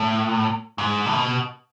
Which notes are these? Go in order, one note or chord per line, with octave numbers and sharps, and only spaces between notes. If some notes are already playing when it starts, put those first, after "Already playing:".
Already playing: A2
G#2
A2
B2